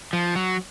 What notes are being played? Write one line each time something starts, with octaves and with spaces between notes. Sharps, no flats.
F3
F#3